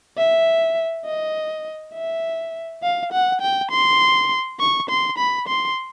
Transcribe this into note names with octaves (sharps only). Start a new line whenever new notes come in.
E5
D#5
E5
F5
F#5
G5
C6
C#6
C6
B5
C6